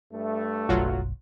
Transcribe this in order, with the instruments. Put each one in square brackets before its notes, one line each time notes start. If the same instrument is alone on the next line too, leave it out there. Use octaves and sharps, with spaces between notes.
[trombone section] G2 A3
[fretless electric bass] F#1 B1 F#2 [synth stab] F#3 F4 F#4